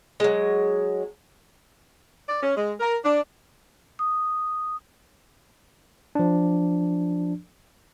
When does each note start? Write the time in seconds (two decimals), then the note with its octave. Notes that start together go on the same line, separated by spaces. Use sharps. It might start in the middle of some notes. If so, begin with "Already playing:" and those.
0.20 F#3 G#3
2.28 D5
2.43 C#4
2.56 G#3
2.80 A#4
3.05 D4
3.99 D#6
6.15 F3 D4